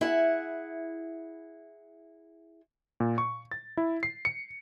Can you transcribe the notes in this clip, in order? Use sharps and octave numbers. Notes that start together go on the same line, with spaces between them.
E4 G#4 F#5
A#2
C#6
A6
E4
C7
C#7